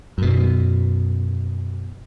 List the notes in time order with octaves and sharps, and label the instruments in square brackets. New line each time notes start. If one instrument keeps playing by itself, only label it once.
[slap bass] F#2 B2